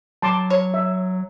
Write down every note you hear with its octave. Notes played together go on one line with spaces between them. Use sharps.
F#3 A5 C6 D6
C#5
E5